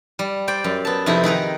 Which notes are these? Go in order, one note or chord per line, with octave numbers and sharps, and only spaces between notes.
G3
C5 D5 G5
F#2
B3 A5
F2 C3 D#4 E4 D#5
D#3 G#4 B4 A#5